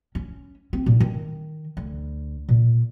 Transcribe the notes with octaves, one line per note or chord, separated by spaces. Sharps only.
C#4
C4
A#2
D#3
D2
A#2